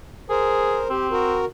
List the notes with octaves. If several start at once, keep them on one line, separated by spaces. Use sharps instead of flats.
G#4 A#4 C5
C4 G4
F#4 A#4